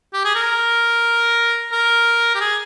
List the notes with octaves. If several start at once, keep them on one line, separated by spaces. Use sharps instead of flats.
G4
G#4
A#4
A#4
G4
G#4